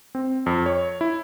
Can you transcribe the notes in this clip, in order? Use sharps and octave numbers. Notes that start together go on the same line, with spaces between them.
C4
F2
C#5
E4